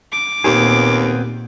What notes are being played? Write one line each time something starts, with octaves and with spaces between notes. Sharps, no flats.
D6
D#2 A#2 B3 C4 G#4